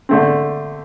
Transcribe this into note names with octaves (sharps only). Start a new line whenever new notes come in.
D3 A3 C4